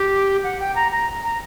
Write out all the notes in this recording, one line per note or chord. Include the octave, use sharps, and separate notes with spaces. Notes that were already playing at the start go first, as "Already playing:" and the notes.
Already playing: G4
F#5
G5
A#5
A#5
A#5